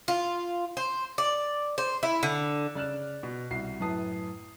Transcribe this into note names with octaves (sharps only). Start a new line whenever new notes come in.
F4
C5
D5
C5
E4
D3
C#3 D5 F6 F#6 E7
B2
C2 F#4 C7
F#2 A2 B4 A5 D#6 C7